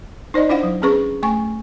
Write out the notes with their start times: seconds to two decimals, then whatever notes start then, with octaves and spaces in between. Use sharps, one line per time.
0.34 D#4 C5 D5 D#5
0.49 D4 E4 C5 F5 F#5
0.63 F#3
0.82 C4 C#4 G#4 B4 C#6
1.23 A3 G#5 C#6